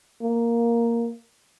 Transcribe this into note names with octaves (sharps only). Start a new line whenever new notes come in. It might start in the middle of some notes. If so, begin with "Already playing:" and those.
A#3